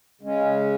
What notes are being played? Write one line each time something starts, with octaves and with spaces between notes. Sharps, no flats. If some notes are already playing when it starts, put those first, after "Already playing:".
C#3 G#3 C#4